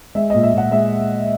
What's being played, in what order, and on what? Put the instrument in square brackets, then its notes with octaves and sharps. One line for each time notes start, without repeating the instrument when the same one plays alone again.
[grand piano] G#3 E5
A#2 D#5
E5
A#2 F#5
G#3 E5